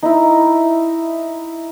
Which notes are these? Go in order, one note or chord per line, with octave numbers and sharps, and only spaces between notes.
D#4 E4